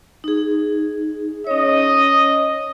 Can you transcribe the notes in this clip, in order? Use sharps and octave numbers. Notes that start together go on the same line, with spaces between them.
D#4 G#4
C#4 C#5 D#5